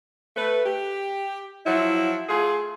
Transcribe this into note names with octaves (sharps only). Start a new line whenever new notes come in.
A3 B4
G4
F3 F#3 E4
A3 F4 G#4